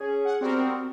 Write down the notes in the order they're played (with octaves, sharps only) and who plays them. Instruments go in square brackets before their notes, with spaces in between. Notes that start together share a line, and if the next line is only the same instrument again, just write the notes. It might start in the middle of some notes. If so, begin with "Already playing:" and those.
[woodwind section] C#4 G#4
[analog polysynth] F#5
[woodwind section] G3 B3 F#4 [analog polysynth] C4 A#4